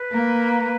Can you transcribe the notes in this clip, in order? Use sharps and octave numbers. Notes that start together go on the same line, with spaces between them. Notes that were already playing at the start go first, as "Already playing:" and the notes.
Already playing: B4
A#3